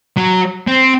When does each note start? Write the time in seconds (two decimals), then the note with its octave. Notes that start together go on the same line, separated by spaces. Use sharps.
0.17 F#3
0.68 C4